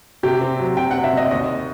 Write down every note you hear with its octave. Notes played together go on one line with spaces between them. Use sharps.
C3 G4
C4
F#3
C3 G5
C3 F#5
E5
C4 D#5
D#2 D#5